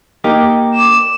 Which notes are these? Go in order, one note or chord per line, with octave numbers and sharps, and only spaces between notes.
A#3 D#4 G4
D5 D6 E7